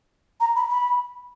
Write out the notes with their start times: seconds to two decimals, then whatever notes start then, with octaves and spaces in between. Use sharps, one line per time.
0.40 A#5
0.56 B5
0.69 B5